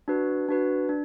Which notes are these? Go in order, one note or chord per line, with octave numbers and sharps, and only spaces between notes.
D4 F#4 B4
D4 F#4 B4
D4